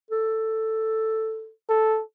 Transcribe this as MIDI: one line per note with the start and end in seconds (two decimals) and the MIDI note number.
0.11 1.51 69
1.69 2.02 69